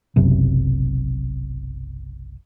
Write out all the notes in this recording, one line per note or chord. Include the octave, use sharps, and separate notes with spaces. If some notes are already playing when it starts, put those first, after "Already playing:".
F#1 B1 F#2 C3